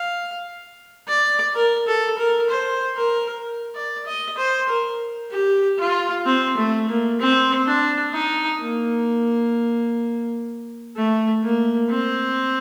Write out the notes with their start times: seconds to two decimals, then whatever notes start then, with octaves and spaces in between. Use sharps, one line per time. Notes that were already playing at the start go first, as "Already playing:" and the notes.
Already playing: F5
1.08 D5
1.55 A#4
1.87 A4
2.18 A#4
2.50 C5
2.97 A#4
3.75 D5
4.06 D#5
4.38 C5
4.69 A#4
5.32 G4
5.79 F4
6.25 C4
6.57 A3
6.89 A#3
7.20 C4
7.66 D4
8.14 D#4
8.61 A#3
10.96 A3
11.43 A#3
11.90 C4